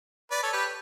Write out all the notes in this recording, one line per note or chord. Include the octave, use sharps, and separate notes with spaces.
B4 D5
A4 C#5
G4 B4